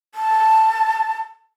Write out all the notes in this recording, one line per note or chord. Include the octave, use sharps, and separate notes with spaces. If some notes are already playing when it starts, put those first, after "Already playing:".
A5